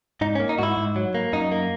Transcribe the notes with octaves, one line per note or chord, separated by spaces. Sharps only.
G#2 D#4
C#4
A#3
D#4
G#2 E4 F#4
G#2
F#3
A#3
F#2 D#4
A#3